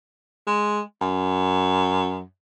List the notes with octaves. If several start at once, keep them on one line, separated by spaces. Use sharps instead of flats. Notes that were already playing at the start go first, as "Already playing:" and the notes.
G#3
F#2